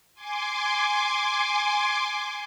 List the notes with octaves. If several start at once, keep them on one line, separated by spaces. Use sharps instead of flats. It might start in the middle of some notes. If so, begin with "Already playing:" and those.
G#5 C6 D6